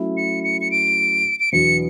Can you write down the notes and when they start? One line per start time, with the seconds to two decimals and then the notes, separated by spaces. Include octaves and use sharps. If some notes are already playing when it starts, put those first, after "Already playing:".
Already playing: F#3 A3 C#4 E4
0.17 C#7
0.44 C#7
0.61 C#7
0.71 D7
1.40 D7
1.52 E2 B2 F#3 B3 D4 C#7